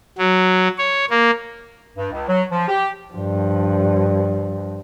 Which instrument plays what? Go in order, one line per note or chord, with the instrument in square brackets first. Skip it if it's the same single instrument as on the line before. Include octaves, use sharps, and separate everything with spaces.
[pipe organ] F#3
C#5
A#3
[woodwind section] G2
C#2
F#3
F3
G4
[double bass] G2 F3